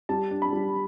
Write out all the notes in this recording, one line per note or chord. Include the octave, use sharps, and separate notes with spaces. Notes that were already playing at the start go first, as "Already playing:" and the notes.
G3 A5
D4
B5
G3